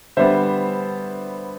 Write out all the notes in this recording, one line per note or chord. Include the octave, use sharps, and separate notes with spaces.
D3 G3 B3 C5 E5